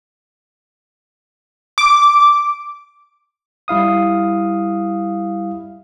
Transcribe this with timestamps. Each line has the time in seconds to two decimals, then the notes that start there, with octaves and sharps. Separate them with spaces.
1.78 D6
3.68 G3 E4 F5 D#6